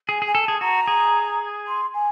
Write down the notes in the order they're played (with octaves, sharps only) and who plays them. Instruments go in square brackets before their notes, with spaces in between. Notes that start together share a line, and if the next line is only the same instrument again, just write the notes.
[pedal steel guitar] G#4 [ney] G#5
[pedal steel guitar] G#4
[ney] G#5
[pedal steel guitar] A4
[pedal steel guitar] G#4 [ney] A5
[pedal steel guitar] F#4 [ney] A#5
[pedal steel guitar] G#4
[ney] C6
G#5